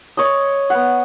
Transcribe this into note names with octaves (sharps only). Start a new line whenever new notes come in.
C#5 D#5
B3 F#5